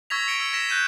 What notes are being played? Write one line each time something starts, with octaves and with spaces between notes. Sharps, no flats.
C#6 E6 G#6 A#6 B6 F7
C#7 D7 G7
E6
A#6 B6 E7
F#6 G6 D#7 E7